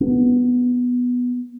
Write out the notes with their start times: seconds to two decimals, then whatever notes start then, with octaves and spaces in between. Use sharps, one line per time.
0.01 B3